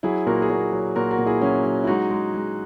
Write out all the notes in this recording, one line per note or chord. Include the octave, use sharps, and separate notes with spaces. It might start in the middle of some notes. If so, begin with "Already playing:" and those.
F#3 E4 G#4
A#2 F#4 A#4
G#4
A#2 F#4 A#4
F#3
A#2 F#4 A#4
F#4 A#4
A#2
E4 G#4
F#3 C#4 E4
F#3
E4
G#3 D#4 F#4
G#3
G#3